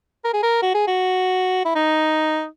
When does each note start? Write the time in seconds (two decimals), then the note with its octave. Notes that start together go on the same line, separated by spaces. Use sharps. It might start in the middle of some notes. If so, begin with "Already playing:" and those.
0.25 A#4
0.34 G#4
0.43 A#4
0.63 F#4
0.75 G#4
0.87 F#4
1.65 E4
1.76 D#4